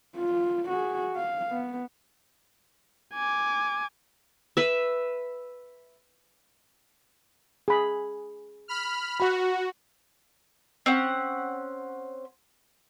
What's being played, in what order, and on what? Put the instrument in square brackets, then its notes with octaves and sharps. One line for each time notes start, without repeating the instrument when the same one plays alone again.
[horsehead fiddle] F4
F#4 G#4
F5
B3
[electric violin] G#5 D6
[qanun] B4 E5
[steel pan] G#4 B5
[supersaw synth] B5 F6
[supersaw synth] F#4 [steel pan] F#5 B5
[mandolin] C4 C#4 F#5